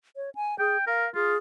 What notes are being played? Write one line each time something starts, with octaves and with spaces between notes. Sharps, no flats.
C#5
G#5
G#4 G5
A#4 F5
F4 G#4